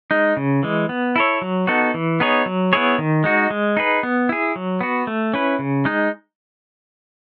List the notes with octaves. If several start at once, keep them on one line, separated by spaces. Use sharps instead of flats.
G#3 D#4
C#3
E3 G#3
B3
E4 A4 C#5
F#3
B3 D#4 F#4 A4
E3
B3 D#4 G#4 C#5
F#3
B3 E4 G#4 C#5
D#3
G#3 D#4 F#4
G#3
D#4 G#4 B4
B3
E4 G#4
F#3
B3 F#4
A3
C#4 E4 B4
C#3
G#3 D#4